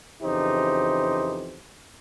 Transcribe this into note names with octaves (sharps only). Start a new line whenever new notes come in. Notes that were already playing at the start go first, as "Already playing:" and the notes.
F2 C#3 E3 D#4 G4 C5